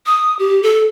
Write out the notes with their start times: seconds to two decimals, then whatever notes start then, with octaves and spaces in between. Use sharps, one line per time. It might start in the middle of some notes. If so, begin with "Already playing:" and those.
0.06 D#6
0.39 G4
0.63 A4